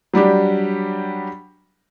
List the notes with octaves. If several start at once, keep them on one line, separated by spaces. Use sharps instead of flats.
F#3 G3 D4 G4